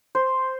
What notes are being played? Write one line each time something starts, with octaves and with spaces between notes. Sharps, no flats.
C5